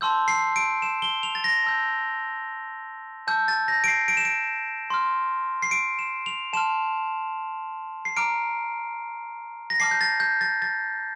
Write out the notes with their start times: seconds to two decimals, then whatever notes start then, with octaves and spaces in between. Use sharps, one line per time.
0.01 A5 C6 E6 G6
0.28 C7
0.56 D7
0.82 E7
1.02 G7
1.23 F7
1.35 A6
1.44 A#6
1.64 A5 E6 G6
3.27 A5 E6 G6
3.48 A6
3.68 A#6
3.84 D7
3.88 C7
4.08 D7
4.17 E7
4.25 D7
4.90 C6 F6
5.62 C7
5.71 D7
5.99 E7
6.26 F7
6.53 A5 C6 F6 E7
8.05 C7
8.17 A#5 D6 F6 D7
9.70 A#6
9.80 A5 D6 F6 C7
9.91 G6
10.01 A6
10.20 G6
10.41 A6
10.62 A6